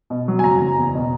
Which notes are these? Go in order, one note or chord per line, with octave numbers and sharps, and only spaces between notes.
B2
F#3
G#5
F#1 A#5
F#1
E2
B2